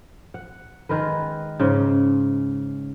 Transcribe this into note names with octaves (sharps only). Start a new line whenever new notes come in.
F#5
D#3 G#3 A#4 B4
G#2 C#3